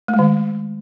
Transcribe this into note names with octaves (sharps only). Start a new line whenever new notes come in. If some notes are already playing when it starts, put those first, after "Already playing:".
A3
G#3
D#3